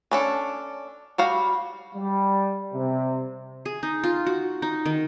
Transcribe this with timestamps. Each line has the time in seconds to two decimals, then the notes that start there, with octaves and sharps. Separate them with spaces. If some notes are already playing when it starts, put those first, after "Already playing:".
0.11 C#4 D4 A4
1.18 G3 F#4 F5
1.95 G3
2.73 C3
3.65 G#4
3.83 D#4
4.03 F4
4.26 F#4
4.62 D#4
4.85 D#3